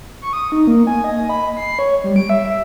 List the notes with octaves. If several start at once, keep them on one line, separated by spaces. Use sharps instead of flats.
C#6
D#6
D#4
A#3
G#5
D#5
B5
C7
C#5
G3
D7
E5